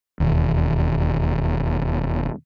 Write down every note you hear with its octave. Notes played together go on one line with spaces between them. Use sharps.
E1 D#2